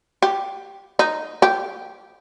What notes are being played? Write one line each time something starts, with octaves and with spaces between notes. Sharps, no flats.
G4
D#4
G4